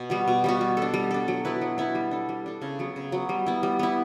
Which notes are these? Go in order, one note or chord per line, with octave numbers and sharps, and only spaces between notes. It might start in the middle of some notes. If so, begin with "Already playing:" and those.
Already playing: B2
G3 B3 F#4
B2
G3 B3 F#4
G3
D4 A4
G3
D4 A4
F#3
B3 E4 B4
F#3
B3 E4 B4
G3
D4 A4
G3
D4 A4
C#3
F#3 B3
C#3
F#3 B3
G3
B3 E4
G3
B3 E4